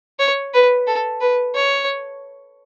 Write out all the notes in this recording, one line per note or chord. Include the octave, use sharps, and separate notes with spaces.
C#5
B4
A4
B4
C#5